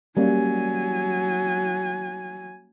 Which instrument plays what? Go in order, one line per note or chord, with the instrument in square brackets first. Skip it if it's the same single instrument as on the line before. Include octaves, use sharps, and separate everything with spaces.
[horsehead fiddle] F#3 G#5 [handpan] G3 A#3 C#4